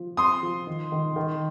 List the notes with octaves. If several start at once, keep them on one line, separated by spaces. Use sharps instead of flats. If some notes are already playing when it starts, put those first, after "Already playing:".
Already playing: F3
C4 C6 D#6
F3
D#3
D#3
D#3